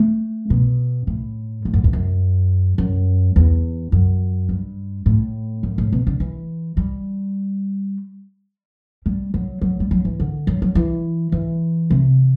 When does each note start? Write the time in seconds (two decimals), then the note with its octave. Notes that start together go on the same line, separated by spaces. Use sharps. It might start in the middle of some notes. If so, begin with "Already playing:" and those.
Already playing: A3
0.50 B2
1.07 A2
1.65 A2
1.74 F#2
1.84 E2
1.93 F#2
2.78 F#2
3.36 E2
3.92 F#2
4.49 G2
5.06 A2
5.63 F#2
5.78 A2
5.92 B2
6.07 D3
6.20 E3
6.77 G3
9.06 G3
9.34 F#3
9.61 F#3
9.80 G3
9.91 F#3
10.05 E3
10.20 D3
10.47 F#3
10.62 F#3
10.75 E3
11.32 E3
11.91 C3